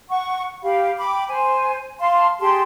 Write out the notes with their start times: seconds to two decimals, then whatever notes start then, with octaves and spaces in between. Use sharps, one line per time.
0.09 F#5 C#6
0.63 G4 F5 B5
0.97 G5 B5 D6
1.29 C5 G#5
1.99 F5 A5 C6
2.40 G4 G#4 A5 C6